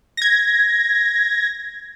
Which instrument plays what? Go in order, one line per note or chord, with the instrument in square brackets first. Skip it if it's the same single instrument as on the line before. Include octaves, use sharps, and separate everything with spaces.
[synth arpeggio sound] G#6 A#6